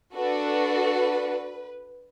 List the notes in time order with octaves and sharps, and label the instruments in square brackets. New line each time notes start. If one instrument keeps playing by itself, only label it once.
[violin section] D4 F#4 A4 B4